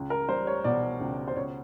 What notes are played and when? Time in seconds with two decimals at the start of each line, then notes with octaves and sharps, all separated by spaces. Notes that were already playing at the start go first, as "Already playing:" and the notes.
Already playing: C#2
0.10 A#4
0.29 G3 C5
0.47 C#5
0.64 B2 D5
1.01 C#2
1.28 C5
1.36 C#2 C#5